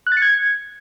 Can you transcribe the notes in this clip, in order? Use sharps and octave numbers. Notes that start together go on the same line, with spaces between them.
F#6
A6
C#7
G#6